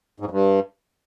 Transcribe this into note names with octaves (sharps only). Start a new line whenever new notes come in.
G#2
F2
G2